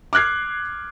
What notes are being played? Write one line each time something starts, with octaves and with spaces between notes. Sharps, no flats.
D6 F6 F#6 G#6 C7